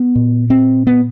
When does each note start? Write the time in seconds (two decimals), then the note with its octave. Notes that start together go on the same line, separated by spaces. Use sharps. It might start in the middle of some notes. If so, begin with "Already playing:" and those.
Already playing: B3
0.15 A#2
0.50 C4
0.87 B3